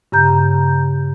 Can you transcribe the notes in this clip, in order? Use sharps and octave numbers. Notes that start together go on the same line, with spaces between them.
G2 C#3 A#5 G6